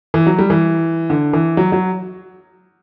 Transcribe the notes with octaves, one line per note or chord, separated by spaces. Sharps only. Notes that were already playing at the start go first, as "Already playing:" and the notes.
E3
F#3
G3
E3
D3
E3
F#3
F#3